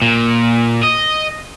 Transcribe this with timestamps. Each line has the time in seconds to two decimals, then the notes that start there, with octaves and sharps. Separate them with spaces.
0.02 A#2
0.83 D#5